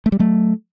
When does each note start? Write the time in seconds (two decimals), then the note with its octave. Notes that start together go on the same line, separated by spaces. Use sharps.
0.06 A3
0.12 G3
0.19 F#3 A3